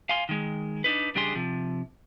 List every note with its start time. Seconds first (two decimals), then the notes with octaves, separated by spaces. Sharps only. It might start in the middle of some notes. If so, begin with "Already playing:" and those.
0.09 F5 G#5 C6
0.29 D#3 G#3
0.84 D4 D#4 B4
1.15 C#3 G3 D4 G4 G#4 C6
1.35 C3 F3